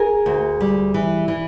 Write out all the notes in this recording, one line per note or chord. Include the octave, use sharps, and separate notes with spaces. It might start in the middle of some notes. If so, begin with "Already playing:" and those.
Already playing: G#4 A#4
D2
G3
E3
E3